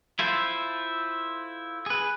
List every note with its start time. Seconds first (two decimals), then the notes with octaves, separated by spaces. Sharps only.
0.19 E4 F4 A4 C5
1.86 G#4 B4